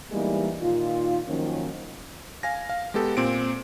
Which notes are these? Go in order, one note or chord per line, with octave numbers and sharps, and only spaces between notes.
E3 G3 G#3 A#3 B3 D#4
A#2 D#3 D#4 F4
D#3 F3 F#3 A#3 C#4
F5 G#5 A#6
F5
G#3 B3 G4 A4
A#2 C4 D7